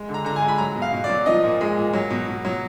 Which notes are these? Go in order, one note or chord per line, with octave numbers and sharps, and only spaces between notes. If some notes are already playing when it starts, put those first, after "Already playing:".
Already playing: G#3
D3
A#5
D3 A#5
G#5
G#3
B5
F#3 A#5
B2
F5
B2
D5
F#3
F3 D#5
A#2
G#3
A#2
F#3
B2
B2
F#3